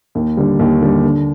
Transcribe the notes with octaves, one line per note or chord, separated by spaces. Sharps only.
D#2
D3 G3
D#2
D3 G3
D3